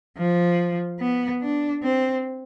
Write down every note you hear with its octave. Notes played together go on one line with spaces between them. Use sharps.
F3
B3
D4
C4